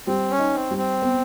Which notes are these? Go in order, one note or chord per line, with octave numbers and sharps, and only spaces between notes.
G3 C4
C#4
D#4
C4
G3
C4
B3